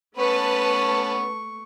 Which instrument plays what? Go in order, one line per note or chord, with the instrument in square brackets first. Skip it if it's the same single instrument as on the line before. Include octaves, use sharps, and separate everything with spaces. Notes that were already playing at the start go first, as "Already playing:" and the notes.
[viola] A3 C#6 [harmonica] B3 C#4 [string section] B4 A5